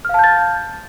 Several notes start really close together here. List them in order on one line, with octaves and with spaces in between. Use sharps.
F6 F5 A5 G6 A6